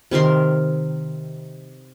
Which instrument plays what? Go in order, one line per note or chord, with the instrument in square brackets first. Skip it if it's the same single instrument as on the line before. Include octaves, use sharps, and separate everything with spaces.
[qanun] C3 D#3 A#4 C6